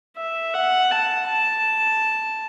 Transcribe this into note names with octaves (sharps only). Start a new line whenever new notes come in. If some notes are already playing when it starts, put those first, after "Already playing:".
E5
F#5
A5
A5